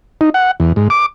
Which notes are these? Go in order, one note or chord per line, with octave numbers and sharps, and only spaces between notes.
D#4
F#5
E2
G#2
D6